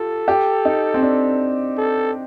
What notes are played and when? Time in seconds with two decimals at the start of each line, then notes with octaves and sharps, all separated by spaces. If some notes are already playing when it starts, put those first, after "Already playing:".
Already playing: F4 G4 A4
0.28 G4
0.65 D#4
0.94 C4
1.03 D4
1.78 A4